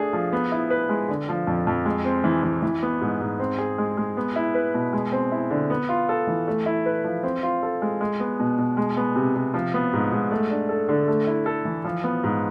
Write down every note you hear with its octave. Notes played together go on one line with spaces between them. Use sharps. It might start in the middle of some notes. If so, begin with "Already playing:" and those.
Already playing: A3 D4 G#4
F3
B3
E4
B4
G#3
D3
F3
F2
F2
G#3
C4
E3
E3
E3
B3
G#2
G#2
C4
G#4
G#3
G#3
B3
E4
B4
B2
G#3
C4
E4
D3
B3
F4
A4
E3
A3
E4
B4
F3
C4
F4
A4
G#3
G#3
B3
B2
B2
G#3
B3
C3
C3
F3
B3
G#2
G#2
A3
D4
A4
D3
A3
E4
A4
E3
F3
B3
G#2